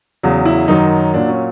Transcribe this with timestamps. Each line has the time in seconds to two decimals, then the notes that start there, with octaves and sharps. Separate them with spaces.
0.23 E2 C#3 F#3
0.45 E4
0.68 F#2 D#3 F#3 D#4
1.14 A#2 F#3 D4
1.29 C#4